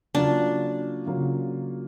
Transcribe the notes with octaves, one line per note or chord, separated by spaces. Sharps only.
C#3 F#3 A#3 C#4 D4 F4
C#3 F#3 A#3 C#4 F4